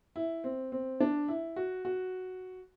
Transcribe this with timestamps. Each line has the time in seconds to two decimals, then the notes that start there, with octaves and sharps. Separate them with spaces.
0.16 E4
0.44 C4
0.72 C4
1.00 D4
1.28 E4
1.56 F#4
1.85 F#4